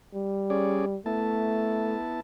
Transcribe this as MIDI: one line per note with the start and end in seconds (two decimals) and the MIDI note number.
0.14 0.98 55
0.50 0.85 61
0.50 0.85 68
0.50 0.85 74
1.06 1.96 57
1.06 2.20 59
1.06 2.20 64
1.06 2.20 81